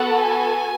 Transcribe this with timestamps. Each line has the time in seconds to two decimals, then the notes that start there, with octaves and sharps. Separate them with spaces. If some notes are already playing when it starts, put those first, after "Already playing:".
Already playing: B3 F#4 A4 F#5
0.23 G#5